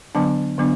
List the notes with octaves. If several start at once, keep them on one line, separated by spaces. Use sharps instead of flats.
D3 F#3 B3 D4 A5
D3 F#3 B3 D4